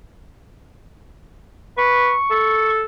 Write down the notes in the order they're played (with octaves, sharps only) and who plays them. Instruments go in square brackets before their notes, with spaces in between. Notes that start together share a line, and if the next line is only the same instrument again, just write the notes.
[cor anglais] B4 [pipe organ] C#6
[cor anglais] A4